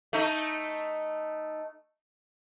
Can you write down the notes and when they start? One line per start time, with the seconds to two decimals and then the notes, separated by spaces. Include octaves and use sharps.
0.13 A3 D#4